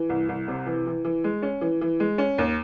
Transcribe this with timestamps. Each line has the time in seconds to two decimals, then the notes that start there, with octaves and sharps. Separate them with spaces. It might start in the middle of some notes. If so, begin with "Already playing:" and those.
Already playing: E3
0.09 C2
0.29 C2
0.48 C3
0.66 E3
0.86 E3
1.05 E3
1.24 G#3
1.42 C#4
1.61 E3
1.81 E3
2.00 G#3
2.18 C#4
2.38 D#2